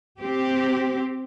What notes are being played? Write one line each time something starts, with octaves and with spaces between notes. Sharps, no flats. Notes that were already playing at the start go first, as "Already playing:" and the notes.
C4 G4